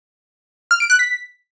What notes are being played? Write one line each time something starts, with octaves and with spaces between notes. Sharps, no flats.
F6
D7
F#6
B6